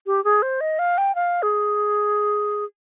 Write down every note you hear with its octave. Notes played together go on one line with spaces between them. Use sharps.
G4
G#4
C5
D#5
F5
G5
F5
G#4